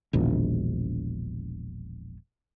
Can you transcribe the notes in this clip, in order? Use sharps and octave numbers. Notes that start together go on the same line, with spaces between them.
E1 A#1 D#3